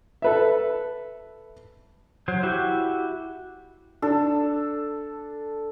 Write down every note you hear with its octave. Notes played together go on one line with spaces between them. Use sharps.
A4 B4 E5
F#3 C5
E4 F#4 G4
D4 A4